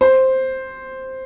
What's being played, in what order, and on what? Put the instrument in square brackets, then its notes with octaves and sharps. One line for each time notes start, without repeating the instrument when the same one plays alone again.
[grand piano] C5